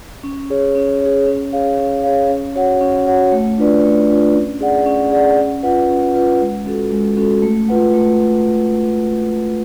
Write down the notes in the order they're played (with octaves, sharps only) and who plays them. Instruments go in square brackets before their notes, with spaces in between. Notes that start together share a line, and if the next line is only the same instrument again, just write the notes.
[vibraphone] C#4
G#4 C#5
C#4
G#4 C#5
C#4
G#4 C#5 F5
C#4
G#4 C#5 F5
C#4
F#4 C#5 F#5
C#4
F#4 C#5 F#5
A3
D4 F4 B4 D5
A3
D4 F4 B4 D5
C#4
G#4 D5 F#5
C#4
G#4 D5 F#5
C#4
F4 B4 F#5
C#4
F4 B4 F#5
G#3
C#4 F#4 A4
G#3
C#4 F#4 A4
A3
F4 B4 F#5
A3